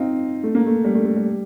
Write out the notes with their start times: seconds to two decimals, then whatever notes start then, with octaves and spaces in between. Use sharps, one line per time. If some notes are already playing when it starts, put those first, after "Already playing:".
Already playing: C4 D#4 F4
0.43 A3
0.55 A#3
0.66 A3
0.84 G3
0.95 A3
1.05 A3
1.16 G3